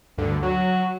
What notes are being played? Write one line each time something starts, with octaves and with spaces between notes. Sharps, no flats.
D2 G2 D3
F#3 F#4